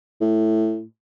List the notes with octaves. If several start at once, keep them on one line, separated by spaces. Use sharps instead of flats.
A2